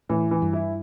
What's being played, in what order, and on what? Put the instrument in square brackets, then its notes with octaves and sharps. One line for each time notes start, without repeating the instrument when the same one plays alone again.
[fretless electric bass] A2 [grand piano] E3
[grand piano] E3
[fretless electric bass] G2
[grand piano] E4